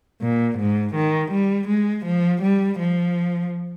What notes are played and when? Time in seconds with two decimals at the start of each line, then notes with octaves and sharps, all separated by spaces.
0.22 A#2
0.59 G#2
0.95 D#3
1.32 G3
1.68 G#3
2.06 F3
2.42 G3
2.79 F3